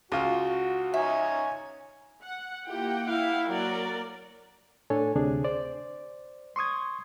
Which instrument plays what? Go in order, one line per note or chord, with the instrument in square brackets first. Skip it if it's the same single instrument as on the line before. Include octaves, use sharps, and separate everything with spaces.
[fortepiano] C#2 F4 [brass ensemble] F#4 [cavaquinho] D#6
[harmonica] D#4 C#5 G#5 [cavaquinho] E5
[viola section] F#5
[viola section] A#3 F#5 G5 [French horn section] E4 F4 G4
[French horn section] E4 [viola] F5
[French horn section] F#3 [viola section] A#3 [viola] A#4 D5
[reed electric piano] A2 D4 A4 C#5 G#5
D2 C3 D4 G#4
C5 D5
C6 C#6 D#6 G#6